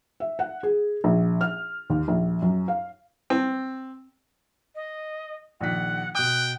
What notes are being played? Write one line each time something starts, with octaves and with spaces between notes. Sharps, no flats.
E5
F#5
G#4
A#1
F6
D#2
A#1
F#2
F5
C4
D#5
A#1 D#3 F#5 B6
B2 G5 D#6 F#6